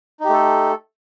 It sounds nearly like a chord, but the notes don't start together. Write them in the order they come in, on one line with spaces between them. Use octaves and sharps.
D#4 G4 A3 A4